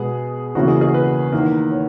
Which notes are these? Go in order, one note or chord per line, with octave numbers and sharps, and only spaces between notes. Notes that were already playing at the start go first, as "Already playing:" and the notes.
Already playing: B2 G#3 B3 G#4
E2 C#3 E3 A#3 F#4
G#4
G#4
B4
E2 D#3 A#3
C#5